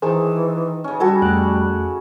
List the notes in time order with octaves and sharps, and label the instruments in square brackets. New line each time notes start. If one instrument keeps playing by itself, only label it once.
[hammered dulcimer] D#3 A5 [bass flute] E3 [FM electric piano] G#4 A#4 C5
[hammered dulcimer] C#3 C#4
[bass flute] G3 [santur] F#4 A4 G#5
[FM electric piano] F2 A3 F#6 [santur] D6